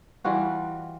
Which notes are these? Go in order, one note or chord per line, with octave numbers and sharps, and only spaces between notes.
E3 G3 F4 F#4